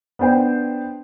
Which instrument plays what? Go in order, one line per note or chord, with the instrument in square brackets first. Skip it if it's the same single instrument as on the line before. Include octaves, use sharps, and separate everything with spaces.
[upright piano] B3 D4 C5 G5